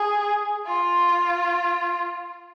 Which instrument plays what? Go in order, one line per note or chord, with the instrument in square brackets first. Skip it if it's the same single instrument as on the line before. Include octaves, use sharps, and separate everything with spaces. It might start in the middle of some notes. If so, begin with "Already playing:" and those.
Already playing: [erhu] G#4
F4